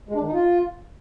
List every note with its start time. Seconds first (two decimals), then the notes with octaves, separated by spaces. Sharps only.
0.09 G#3
0.15 D4
0.21 D#3
0.27 D#4
0.33 F4